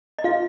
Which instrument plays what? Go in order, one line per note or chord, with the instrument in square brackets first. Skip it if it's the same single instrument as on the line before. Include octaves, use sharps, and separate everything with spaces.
[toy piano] D#5
[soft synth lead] F4 [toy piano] F5